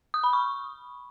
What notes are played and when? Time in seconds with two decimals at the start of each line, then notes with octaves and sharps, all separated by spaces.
0.14 D#6
0.24 B5
0.33 C#6